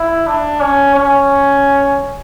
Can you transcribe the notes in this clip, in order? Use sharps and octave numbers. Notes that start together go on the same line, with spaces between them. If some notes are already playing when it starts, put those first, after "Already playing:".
Already playing: E4
D4
C#4
C#4